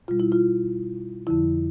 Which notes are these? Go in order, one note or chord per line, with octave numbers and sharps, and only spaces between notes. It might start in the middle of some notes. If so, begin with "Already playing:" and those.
B2 G3 F4
E4
F4
F2 D3 F3 E4